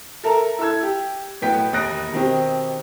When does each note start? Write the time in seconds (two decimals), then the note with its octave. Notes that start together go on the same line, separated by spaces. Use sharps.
0.24 A4 A#4 E5 A5 A#5
0.59 E4 A4 E6 G#6
0.83 G4
1.42 B1 A2 B3 G5 B6
1.72 E1 D#2 D#6 F#6 A#6 D7
2.13 B2 D#3 C4 G4